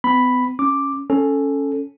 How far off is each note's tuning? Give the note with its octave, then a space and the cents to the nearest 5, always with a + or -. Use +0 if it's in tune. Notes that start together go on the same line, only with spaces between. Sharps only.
B3 +40 B5 +0
C#4 +0 D6 +0
C#4 +0 A4 +0